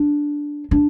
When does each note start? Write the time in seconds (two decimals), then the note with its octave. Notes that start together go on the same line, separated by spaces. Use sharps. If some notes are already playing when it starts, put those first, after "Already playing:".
Already playing: D4
0.71 D4